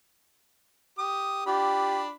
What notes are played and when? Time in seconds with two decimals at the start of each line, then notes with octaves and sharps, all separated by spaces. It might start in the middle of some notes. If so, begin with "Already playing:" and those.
0.98 G4 D#6
1.46 D4 F4 G4 B5